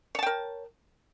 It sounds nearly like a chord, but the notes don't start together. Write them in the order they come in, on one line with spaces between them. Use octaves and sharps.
C#5 A5 G5 A#4